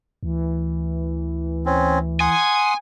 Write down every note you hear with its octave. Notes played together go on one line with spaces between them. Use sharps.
D2 E3
C4 C#4
F#5 G#5 C6 D#6